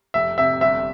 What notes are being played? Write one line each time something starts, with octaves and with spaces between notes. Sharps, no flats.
F1 E5
C3 E5
G1 E5